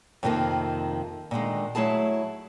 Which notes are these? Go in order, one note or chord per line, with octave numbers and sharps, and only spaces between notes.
F2 C3 D#3 F3 A#3
A#2 D3 D#3 G#3
F#3 A3 E4 G#4 A5